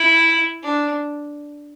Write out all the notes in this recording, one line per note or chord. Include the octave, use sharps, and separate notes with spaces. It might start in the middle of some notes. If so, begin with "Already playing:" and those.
Already playing: E4
D4